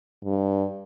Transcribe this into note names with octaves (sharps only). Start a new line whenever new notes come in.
G2